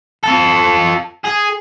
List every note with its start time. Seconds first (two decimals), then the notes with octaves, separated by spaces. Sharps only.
0.24 F4 A4
1.24 G#4